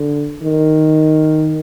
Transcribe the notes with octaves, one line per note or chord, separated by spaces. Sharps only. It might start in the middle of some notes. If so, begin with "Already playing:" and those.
Already playing: D3
D#3